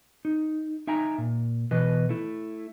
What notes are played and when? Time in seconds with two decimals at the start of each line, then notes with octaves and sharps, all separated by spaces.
0.25 D#4
0.87 D#4 E5 G5 G#5 A#5
1.18 A#2
1.71 B2 E3 B4 D#5
2.09 A3 E4